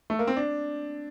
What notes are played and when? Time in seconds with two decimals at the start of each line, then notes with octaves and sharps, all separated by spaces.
0.10 A3
0.19 A#3
0.27 C4
0.37 D4